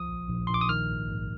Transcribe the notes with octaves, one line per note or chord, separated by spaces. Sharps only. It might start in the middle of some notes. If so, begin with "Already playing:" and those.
Already playing: C2 F3 D#6
A#1
A#1
A#1 C6
D6
D#6
D#3 F6
G#1
G#1